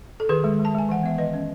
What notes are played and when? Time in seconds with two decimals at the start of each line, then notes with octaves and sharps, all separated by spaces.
0.20 A4
0.29 D#3 G#4 B4
0.44 G#3
0.59 G#3
0.65 A5
0.75 G#3 G#5
0.89 E3 F#5
1.03 B3 E5
1.18 D#3 B4 D#5
1.34 C#4